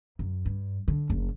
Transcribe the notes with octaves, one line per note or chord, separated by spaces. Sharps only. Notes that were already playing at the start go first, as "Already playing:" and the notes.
F#2
G2
D3
F#1